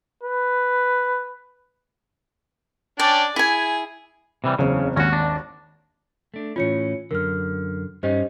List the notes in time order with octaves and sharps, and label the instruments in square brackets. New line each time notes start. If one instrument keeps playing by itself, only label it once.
[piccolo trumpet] B4
[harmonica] C#4 D4 G5 [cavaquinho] D5
[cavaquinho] E4 G#5 [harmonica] G#4
[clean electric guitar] C3 E3 G3
[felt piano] F#1 E2 C4 [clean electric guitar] C#3
[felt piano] G#1 D#2 A#6 [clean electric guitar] C#4 F#4
[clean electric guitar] D4
A3 D4
[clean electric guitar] A2 E3 C#4 [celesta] F4 C#5 C#7
[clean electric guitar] F#2 D3 [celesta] A#4 F6
[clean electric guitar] G2 C#4 D#4 [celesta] G4 C5 D#5